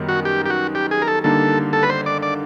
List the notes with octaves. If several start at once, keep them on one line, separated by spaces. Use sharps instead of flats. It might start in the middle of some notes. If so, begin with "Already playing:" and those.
Already playing: F#2 D#3 G3 B3
F#4
G4
G4
F#4
G4
G#4
A#4
A4
D3 G3 A#3 D#4 A4
A4
B4
C5
D5
D5